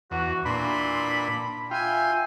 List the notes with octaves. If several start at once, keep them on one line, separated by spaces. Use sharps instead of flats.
E2 F#4
A#2 E3 D4 B5 C6
F4 E5 G5 G#5